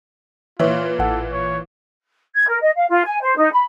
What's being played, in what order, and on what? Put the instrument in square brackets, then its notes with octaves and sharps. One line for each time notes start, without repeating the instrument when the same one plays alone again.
[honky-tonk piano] A#2 E3 [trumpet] F4 [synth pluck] C#5 E5
[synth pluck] A1 F#5 [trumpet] A4
[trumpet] C#5
[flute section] G#6
A#4
D#5
F5
F4
G#5
C5
D#4
B5